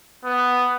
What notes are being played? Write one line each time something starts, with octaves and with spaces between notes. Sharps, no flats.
B3